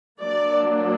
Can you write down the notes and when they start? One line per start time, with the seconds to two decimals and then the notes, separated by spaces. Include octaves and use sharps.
0.21 F#3 A#3 D4 D5